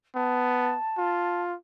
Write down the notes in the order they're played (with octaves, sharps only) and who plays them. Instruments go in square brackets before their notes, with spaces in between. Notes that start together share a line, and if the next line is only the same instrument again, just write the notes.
[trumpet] B3 [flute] A5
[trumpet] F4